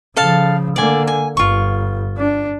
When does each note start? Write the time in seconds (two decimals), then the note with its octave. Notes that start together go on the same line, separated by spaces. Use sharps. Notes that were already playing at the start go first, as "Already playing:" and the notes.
0.16 C#3 F3 A4 F5 A5
0.76 D3 A#3 D5 G#5
1.07 G#5
1.37 G1 G2 F4 C#6
2.18 D4